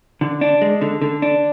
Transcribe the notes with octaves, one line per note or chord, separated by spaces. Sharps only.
D3
D4
G#3
D3
D3
D4